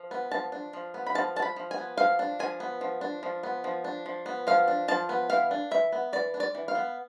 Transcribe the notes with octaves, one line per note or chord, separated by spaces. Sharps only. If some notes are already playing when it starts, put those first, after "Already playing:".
Already playing: F3
B3
F3 A5
D4
F3
B3
B5
F3 A5
D4 A5
B5
F3
G#5
B3
F3 F5
D4
F3 G#5
B3
F3
D4
F3
B3
F3
D4
F3
B3
F3 F5
D4
F3 A5
B3
E3 F5
D4
E3 E5
B3
E3 D5
D4
D5
E3
F5
B3